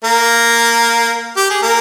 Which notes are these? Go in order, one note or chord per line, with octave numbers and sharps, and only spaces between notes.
A#3 A#4
G4
G#4
A#3 A#4